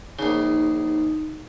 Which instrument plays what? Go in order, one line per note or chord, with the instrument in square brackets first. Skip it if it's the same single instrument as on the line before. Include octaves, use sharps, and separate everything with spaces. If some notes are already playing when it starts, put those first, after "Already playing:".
[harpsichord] A#1 C#3 [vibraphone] D#4